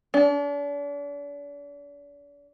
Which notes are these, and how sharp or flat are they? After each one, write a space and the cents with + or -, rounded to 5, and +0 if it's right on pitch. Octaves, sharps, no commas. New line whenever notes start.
D4 -40